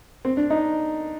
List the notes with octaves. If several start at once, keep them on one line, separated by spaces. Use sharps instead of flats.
C4
D4
D#4